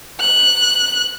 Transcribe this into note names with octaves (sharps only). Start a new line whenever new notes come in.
F#6